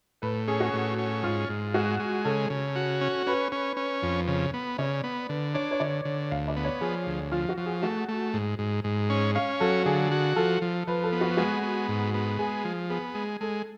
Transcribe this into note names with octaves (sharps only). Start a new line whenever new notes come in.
A2 B4
C#4 G#4
F#4
A2
C#4
G#2 F4
G#2
G#3 F#4
G#3
C#3 A4
C#3
F#4
C#4
C#4 B4
C#4
C#4
F2
C#3
B3
C#3 D5
B3
D3 B4
D4 C#5
C#5
D3 D5
D3
D2 F5
D5
B3
C#5
F3 G#4
D2
F3 F4
F#4
F3
G#4
A3 F#4
A3
G#2
G#2
G#2
C#4
C#4 F5
F#3 A4
D3 G#4
F#4
F3 A4
F3
F3 B4
A4
B3
F#4
G#3 F#4
B3
G#2
B3
G#3 G#4
F3
B3 G#4
G#3
G#3 A4